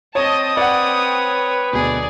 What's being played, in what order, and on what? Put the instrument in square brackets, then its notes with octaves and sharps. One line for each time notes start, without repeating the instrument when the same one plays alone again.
[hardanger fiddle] C4 D#6 [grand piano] C#5 [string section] D#5 A5
[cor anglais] B4 [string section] C#5 G5 [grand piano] D5 F#5
[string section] D2 F#3 G#3 [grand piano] B2 [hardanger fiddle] G#4 D5